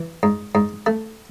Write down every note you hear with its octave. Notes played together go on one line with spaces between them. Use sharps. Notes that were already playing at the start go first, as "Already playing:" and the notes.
Already playing: E3
G#2
G#2
A3